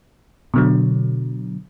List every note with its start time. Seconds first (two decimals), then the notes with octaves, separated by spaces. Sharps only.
0.54 B2 D3 F#3